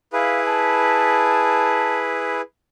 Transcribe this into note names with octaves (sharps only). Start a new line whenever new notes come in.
E4 G#4 B4 F5
A5